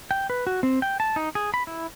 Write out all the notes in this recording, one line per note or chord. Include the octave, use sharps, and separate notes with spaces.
G5
B4
F#4
C4
G5
A5
D#4
G#4
B5
E4